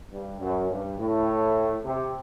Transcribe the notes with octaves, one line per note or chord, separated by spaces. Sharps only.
G2
F#2
G2
A2
C3